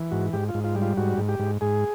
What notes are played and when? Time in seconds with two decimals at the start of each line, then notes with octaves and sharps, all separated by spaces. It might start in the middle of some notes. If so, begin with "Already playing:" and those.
Already playing: E3
0.11 G#2 F#4
0.33 G#2 G4
0.49 F4
0.54 G#2
0.64 F4
0.75 G3
0.81 F4
0.97 G#2 F#4
1.18 G#2
1.29 G4
1.39 G#2
1.61 G#2 G#4